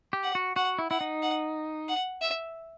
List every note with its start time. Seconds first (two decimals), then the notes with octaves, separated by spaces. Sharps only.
0.13 G4
0.23 F#5
0.35 F#4
0.56 F#4 F#5
0.79 E4
0.90 E4 F#5
1.01 D#4
1.22 F#5
1.88 F#5
2.22 E5